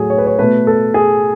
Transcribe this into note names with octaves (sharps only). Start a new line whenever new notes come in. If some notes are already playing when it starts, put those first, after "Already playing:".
Already playing: A2 F#3 A3 G#4 A4
C#5
B4
C#5
B2 A3 B4
A4
G#4